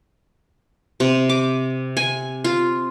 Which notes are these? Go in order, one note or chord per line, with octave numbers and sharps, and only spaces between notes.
C3
D6
G#5
F4